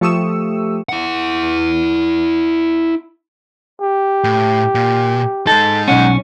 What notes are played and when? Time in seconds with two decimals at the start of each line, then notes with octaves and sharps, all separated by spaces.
0.01 F3 A3 G4 C#6 D#6 E6
0.89 E4 F#5
3.81 G4
4.24 A2
4.75 A#2
5.47 G#3 D#4 A4
5.88 B1 C#4 F#5